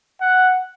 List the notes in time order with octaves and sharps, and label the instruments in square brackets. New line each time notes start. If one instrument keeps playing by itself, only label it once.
[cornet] F#5